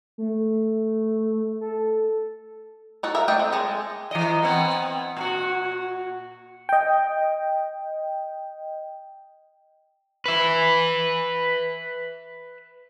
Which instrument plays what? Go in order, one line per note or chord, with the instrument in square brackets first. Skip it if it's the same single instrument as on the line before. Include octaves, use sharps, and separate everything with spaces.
[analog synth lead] A3
A4
[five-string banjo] D#4 F#4 A4
A#4 E5 F5
A3 D4 D#5 G5
C4
G#3 G#4 A4 D#5
[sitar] E3 D#5
B3 C4
A#2 F#4
[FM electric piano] D#5 G5
[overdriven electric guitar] B4 E5